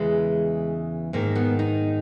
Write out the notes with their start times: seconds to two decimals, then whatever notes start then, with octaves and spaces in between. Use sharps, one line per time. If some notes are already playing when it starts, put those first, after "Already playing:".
Already playing: E2 C#3 E3 G#3
1.13 G#2 D#3 A#3
1.36 B3
1.59 D#4